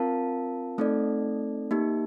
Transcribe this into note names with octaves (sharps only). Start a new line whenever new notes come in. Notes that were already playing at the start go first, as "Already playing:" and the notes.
Already playing: C4 F4 A#4 F5 A5
A3 C4 D#4 A4 D5
A#3 D#4 G4